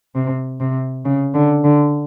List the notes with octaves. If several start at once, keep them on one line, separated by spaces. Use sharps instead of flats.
C3
C3
C#3
D3
D3